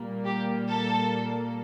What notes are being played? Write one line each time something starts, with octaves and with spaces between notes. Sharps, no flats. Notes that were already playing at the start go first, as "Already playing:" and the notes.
Already playing: A#2 G3 A#3
G4
A4